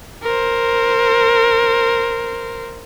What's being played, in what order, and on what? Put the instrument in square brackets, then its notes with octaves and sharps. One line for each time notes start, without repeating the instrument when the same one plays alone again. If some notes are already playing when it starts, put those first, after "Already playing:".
[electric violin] A#4 C5